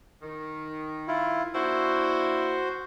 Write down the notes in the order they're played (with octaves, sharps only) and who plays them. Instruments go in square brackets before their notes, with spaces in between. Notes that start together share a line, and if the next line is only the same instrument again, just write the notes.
[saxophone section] D#3
[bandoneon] E4 F4
[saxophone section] A#3 D4 E4 [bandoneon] F#4 C5